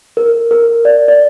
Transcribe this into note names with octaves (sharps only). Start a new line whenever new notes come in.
A#4
A#4
D5
D5